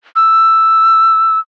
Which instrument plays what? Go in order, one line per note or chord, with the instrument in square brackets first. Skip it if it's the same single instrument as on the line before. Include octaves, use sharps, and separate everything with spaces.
[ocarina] E6